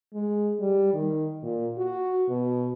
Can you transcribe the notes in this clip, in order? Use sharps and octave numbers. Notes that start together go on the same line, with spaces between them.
G#3
G3
D#3
A#2
F#4
B2